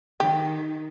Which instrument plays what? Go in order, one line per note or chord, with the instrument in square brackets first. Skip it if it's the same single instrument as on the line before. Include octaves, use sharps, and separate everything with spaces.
[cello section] D#3 [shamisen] G4